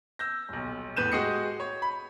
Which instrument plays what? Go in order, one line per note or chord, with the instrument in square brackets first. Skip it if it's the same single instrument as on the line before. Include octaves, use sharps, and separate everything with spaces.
[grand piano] E6 G6 A#6
D#1 B1
E2 A2 B4 G6 D#7 E7
G#3 F#4 G4 D#5 C7 C#7
C#5
B5